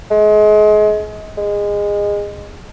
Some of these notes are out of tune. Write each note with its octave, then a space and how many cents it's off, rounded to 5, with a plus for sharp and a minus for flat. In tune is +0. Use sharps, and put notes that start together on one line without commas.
G#3 +30
G#3 -20